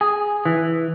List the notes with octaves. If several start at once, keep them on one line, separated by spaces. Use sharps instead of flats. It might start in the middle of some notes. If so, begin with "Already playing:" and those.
G#4
E3